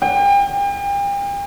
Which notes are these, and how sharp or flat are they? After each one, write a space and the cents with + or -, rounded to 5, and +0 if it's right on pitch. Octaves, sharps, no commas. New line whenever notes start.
G5 +40